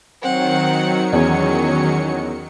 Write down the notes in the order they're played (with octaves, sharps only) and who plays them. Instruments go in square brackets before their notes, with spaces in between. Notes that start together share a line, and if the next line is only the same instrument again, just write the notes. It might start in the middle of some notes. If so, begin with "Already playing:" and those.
[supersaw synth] D#3 F#3 C#7 [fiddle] C4 F#5
[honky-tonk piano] E2 [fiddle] C#4